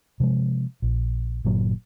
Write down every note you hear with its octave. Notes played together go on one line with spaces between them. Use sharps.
C3 F3 G#3
A#1
G1 A#2 F#3